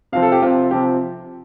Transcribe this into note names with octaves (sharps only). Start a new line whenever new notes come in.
C3 F3 C4 F5
A4
G4
C3 F3 C4 F4
C3 F3 C4 G4